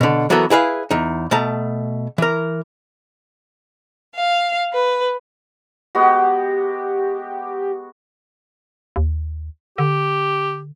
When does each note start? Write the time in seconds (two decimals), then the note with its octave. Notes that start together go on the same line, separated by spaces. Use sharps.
0.01 B2 D3
0.30 E3 F#3 B3 F#4 A4 A#4
0.50 E4 G#4 B4 F5
0.91 E2 D#4
1.31 B2 A3 A5 A#5
2.18 E3 A#4
4.15 F5
4.74 B4
5.95 G#3 B3 F#4 G4
8.96 D#2
9.78 D3 G4